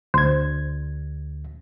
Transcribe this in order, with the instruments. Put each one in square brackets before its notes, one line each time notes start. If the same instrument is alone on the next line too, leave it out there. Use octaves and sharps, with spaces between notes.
[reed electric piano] D2 G#6 [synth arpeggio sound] C5